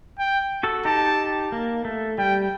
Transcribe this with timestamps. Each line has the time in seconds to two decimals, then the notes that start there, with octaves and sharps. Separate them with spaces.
0.19 G5
0.63 F#4 A4
0.85 D#4 G4 A5
1.52 A#3
1.85 A3
2.18 G3 G5